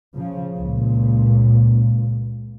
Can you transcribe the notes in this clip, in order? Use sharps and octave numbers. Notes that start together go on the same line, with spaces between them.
C#3 F3
C#2 A#2